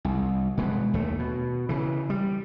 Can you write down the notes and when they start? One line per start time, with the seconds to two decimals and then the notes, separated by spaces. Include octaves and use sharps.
0.05 C2
0.57 B2 G#3 B3
0.94 D#2 A3
1.19 B2
1.69 C#3 E3
2.10 G3